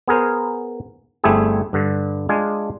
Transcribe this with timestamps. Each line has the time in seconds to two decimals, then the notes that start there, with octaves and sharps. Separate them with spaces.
0.08 B3 G#4 A#4 C5
1.24 G1 A3 C4 E4 G4 G#4
1.73 G2 D3
2.29 G#3 D4 F4 G#5